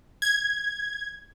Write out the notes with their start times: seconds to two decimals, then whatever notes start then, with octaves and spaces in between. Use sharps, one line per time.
0.22 G#6